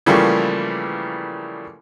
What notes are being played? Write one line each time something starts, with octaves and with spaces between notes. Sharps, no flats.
C#3 E3 F3 G3 A3 A#3